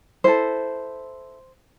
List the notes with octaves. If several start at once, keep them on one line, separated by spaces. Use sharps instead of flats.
E4 A4 C5